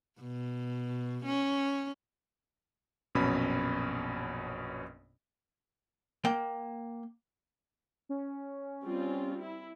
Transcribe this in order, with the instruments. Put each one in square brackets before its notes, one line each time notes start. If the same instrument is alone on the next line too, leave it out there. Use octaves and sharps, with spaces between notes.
[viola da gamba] B2
C#4
[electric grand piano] A#1 F#2 B2 C#4 B5
[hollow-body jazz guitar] A#3 G5
[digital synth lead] C#4
[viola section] G3 C4 F4
E4